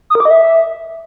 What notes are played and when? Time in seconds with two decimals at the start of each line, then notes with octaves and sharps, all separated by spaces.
0.10 D#6
0.15 A#4
0.20 D6
0.25 D#5
0.30 E5